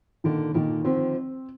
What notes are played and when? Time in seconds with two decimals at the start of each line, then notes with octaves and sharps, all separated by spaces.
0.24 A#2 D3 D#3
0.54 A#2 D3 D#3
0.85 D3 F3 C4